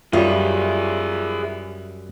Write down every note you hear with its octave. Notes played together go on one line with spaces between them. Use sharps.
F#2 G3 F4 G#4 E5